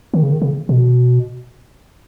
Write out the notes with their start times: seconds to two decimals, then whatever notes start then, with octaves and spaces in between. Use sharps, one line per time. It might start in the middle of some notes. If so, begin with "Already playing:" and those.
0.14 D#3
0.23 C#3
0.32 D#3
0.42 C#3
0.69 B2